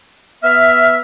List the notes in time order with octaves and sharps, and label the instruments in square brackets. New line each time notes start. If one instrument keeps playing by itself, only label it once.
[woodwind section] B3 E5 [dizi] F6